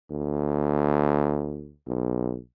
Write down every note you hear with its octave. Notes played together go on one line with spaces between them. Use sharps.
D2
B1